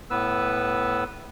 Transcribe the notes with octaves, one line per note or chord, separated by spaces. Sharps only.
A2 B3 B4 E6